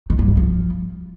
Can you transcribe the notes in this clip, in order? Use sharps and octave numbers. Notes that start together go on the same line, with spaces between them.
D#3
G2
G#2
F3